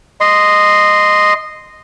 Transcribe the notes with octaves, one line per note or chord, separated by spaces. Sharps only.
D#5 C6